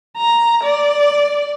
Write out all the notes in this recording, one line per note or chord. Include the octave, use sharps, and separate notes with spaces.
A#5
D5